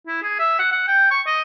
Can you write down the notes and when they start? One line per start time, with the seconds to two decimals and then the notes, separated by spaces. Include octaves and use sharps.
0.07 E4
0.22 G#4
0.39 E5
0.59 F#5
0.72 F#5
0.88 G5
1.11 C#6
1.26 D#5